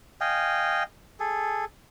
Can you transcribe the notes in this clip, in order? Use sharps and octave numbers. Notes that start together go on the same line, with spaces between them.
D#5 F5 G5 G#5
G#4 A4